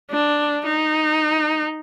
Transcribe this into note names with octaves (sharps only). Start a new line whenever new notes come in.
D4
D#4